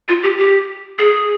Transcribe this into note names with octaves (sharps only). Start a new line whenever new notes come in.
F4
G4
G4
G#4